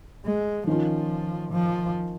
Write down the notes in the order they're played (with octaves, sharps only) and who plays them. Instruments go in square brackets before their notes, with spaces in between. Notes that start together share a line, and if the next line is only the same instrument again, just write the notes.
[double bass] G#3
[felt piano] D#3 C#4 F4 [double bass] F3
[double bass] F3